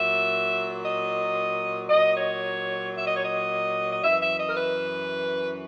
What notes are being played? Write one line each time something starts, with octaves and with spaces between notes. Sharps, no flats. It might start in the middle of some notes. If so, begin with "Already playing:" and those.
Already playing: A#2 F#3 E5
D#5
A#2 F#3 D#5
C#5
E5
D#5
C#5
D#5
D#5
F#2 E3 E5
E5
D#5
A#4
B4